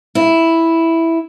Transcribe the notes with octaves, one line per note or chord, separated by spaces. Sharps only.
E4